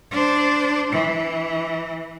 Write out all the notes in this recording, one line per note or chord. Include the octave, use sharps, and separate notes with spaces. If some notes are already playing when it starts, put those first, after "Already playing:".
D4 C5
E3